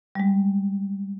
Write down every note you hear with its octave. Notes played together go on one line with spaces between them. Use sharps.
G3 G#3